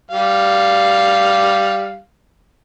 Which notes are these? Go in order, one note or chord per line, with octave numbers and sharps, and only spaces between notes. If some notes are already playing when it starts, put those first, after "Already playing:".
G3 F5